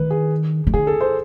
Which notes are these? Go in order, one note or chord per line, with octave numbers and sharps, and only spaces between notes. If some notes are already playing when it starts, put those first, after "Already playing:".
Already playing: D#3 B4
G#4
D#3
D3 G#4
A4
C5